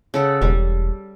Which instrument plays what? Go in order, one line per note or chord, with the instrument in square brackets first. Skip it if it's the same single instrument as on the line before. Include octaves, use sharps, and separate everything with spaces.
[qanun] C#3 A4 F#5
[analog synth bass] E1 [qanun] G3